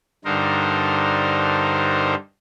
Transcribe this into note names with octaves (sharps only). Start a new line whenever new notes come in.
G2 D3 D#4 A#4 C5